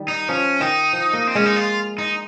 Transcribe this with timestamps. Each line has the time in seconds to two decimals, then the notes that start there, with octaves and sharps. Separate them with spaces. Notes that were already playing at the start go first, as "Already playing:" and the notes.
Already playing: D#3 G3
0.08 D#4
0.29 F3 C#4
0.60 D#3 D#4
0.93 F3
1.13 A#3
1.27 C4
1.35 G#3 C#4
1.45 D#4
1.56 F4
1.98 D#4